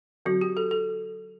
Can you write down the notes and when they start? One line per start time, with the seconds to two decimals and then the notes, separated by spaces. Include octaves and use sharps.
0.26 D3 F#3 C4 F#4
0.41 G4
0.57 A4
0.71 A4